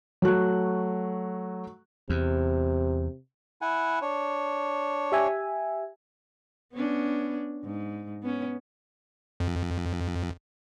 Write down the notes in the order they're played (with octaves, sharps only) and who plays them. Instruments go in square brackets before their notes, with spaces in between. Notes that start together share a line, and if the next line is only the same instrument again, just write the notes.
[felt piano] F#3 A3 F#4 F#6
[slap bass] E2 [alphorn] C3
[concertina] E4 F#5 G#5
D4 C#5
[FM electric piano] G4 E5 G#5
[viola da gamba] B3 C#4 D4
G#2
B3 C#4
[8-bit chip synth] F2